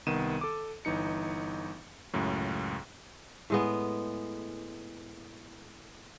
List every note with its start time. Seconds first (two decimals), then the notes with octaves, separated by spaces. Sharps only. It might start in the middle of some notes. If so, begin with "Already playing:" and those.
0.07 C2 D#3 B3 D#7 E7
0.41 A4 D6
0.85 G1 E3 D#4 C#7
2.13 C#2 F#2 A2
3.50 A2 G#3 B3